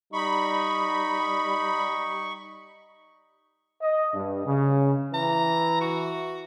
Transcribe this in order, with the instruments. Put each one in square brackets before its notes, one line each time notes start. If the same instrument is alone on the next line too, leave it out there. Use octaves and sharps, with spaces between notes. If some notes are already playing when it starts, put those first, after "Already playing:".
[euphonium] G3 [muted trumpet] D#4 [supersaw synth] B5 [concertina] C#6
[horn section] D#5
G2
C#3
[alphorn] E3 [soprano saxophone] A#5
[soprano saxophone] F#4